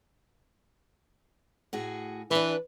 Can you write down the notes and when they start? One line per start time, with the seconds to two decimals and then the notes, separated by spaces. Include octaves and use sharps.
1.73 A2 F#4 G#4
2.31 E3 D4 B4